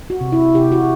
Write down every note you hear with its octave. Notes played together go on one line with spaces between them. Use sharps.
F#4
C3
E4
C3 G4
F#4